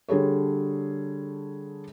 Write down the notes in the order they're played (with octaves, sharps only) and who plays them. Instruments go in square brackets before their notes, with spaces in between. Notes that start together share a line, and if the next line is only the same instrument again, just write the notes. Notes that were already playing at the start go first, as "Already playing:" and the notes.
[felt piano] D3 G3 G#4 A4 C#5